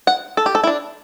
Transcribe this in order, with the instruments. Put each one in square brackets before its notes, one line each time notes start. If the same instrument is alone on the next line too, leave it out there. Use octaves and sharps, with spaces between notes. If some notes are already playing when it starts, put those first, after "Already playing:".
[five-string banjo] F#5
A4
G4
A4
E4
D4